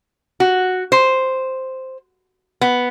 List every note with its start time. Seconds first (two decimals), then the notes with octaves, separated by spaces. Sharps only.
0.40 F#4
0.92 C5
2.61 B3